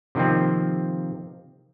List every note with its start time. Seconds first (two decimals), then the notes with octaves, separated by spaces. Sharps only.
0.15 C3 D#3 F3 A#3 C4